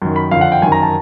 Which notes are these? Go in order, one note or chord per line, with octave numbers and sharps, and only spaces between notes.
F#2 D#3
B5
F2 D3 F5
F#5
G5
F#2 D#3 G#5
A#5
A5